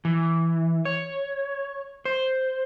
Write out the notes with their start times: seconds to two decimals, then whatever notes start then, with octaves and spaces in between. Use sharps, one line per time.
0.05 E3
0.85 C#5
2.05 C5